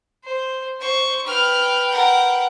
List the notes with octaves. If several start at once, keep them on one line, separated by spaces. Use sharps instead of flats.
C5
C5 C#6
B4 G5 F6
A#4 F#5